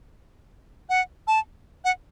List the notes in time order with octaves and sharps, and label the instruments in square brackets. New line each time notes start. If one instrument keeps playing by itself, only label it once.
[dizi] F#5
A5
F#5